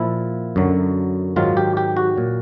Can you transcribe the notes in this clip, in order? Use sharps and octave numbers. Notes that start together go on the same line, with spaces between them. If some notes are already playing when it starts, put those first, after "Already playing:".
Already playing: A#2 F3 E4
F#2 D3 F#3
G#2 D#3 F#3 F4
G4
G4
F#4
A#2 F#3